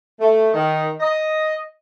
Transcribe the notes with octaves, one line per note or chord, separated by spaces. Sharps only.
A3
D#3
D#5